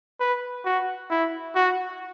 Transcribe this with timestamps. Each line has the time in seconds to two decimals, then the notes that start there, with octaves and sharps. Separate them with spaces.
0.20 B4
0.65 F#4
1.11 E4
1.55 F#4